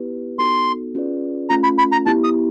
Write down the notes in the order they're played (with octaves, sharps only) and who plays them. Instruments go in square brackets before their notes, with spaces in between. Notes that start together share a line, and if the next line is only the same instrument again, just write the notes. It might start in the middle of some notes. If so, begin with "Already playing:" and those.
Already playing: [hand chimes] B3 E4 G4 B4
[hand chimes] B3 D#4 F#4 A4 [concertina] C6
[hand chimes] C#4 F4 G#4 B4 D5
[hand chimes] A3 C#4 F4 A4 [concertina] A#5
[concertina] B5
B5
A#5
[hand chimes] B3 E4 G4 [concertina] A5
[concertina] D#6